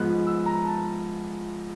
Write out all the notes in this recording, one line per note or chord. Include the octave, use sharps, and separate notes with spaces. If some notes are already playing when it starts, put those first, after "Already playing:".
Already playing: G#2 F3 G#3 B3 F#6
E6
A#5
A5